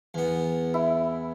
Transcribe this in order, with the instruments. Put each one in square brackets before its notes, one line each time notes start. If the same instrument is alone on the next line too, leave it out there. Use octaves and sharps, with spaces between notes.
[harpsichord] E2 B3
[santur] E4